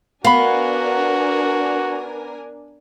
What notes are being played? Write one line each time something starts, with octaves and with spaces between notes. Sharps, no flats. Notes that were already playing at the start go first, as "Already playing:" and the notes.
B3 D4 F#4 A#4 F5 G#5 B5